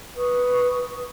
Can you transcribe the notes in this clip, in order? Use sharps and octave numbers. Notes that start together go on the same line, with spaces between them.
B4 C#6 D#6